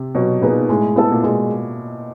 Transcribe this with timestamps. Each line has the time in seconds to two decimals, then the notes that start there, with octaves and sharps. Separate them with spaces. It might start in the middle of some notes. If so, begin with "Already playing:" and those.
Already playing: C3
0.15 B2 F#3
0.41 A#2 B3 D#4 G#4 B4
0.69 A2 G#3
0.96 B3 E4 A4
1.12 A#2
1.23 B2 G#3